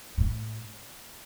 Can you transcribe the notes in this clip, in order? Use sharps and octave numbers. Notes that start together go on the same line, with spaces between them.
A2